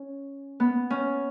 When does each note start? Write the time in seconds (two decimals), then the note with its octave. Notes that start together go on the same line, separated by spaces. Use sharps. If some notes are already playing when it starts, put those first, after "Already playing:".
Already playing: C#4
0.60 B3
0.90 C#4